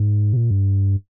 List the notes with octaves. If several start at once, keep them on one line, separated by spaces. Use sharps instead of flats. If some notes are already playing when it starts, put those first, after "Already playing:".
Already playing: G#2
C3
A#2
G2